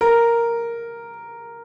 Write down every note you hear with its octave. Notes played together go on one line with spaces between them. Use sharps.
A#4